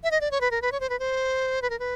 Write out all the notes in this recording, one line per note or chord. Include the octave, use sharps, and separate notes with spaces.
E5
D#5
D5
C#5
B4
A#4
B4
C#5
C5
B4
C5
B4
A#4
B4